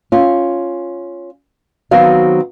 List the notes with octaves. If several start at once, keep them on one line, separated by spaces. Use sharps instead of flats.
C#4 F4
D#3 F#3 B3 C4 F#4 F5